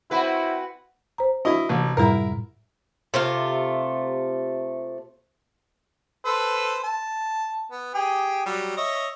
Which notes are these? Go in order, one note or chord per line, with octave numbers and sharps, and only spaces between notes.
C4 E4 F#4 B4
C5 A#5
D4 E4 F#4 D#5
A1 C3
F#2 A2 G3 E4 A#4
C3 A3 F4
A4 B4 C5
A5
B3
G4 G#4
F#3 G3
C#5 D#5 E5